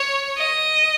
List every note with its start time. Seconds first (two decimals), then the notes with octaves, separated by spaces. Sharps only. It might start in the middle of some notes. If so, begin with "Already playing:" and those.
Already playing: C#5
0.38 D#5